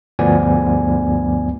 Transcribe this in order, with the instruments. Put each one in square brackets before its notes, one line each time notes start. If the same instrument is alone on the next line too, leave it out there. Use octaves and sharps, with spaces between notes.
[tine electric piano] D2 G2 F3 B3 D5 G#5